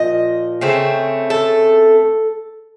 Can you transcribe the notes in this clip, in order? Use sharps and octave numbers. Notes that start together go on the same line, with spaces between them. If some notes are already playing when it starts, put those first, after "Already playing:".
Already playing: A#2 F3 D#5
C#3 A3 C4
A4